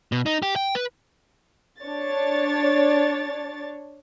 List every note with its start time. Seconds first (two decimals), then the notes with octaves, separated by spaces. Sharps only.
0.12 B2
0.26 D#4
0.42 G4
0.56 G5
0.75 B4
1.81 D4 C#5 A6